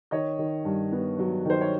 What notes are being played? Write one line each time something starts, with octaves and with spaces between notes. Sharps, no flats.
D#3 C#5 D#5
D#3
G2
B3
F#3
D#3 C5
C#5